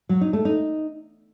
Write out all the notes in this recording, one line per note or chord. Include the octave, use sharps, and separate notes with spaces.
F#3
D#4
A3
D#4